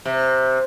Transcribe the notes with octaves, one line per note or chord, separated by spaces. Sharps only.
C3